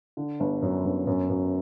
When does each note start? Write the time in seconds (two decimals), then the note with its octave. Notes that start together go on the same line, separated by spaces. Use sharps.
0.17 D3
0.40 G1
0.62 F#2
0.85 G1
1.07 F#2
1.29 F#2